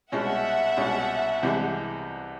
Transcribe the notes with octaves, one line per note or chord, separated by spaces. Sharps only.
C2 B2 G#3 C#4 E5 F#5
C2 B2 G#3 C#4
C2 C3 E3 G#3